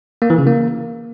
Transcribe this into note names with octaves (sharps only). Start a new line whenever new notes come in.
A#3
E3
C#3
A#3